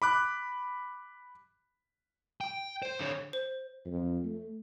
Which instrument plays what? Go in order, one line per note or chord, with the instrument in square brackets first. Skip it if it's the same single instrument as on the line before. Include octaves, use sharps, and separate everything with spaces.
[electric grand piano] B5 D6 F#6
[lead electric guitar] G5
C5
D3 C#5
[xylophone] C5
[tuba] F2
A3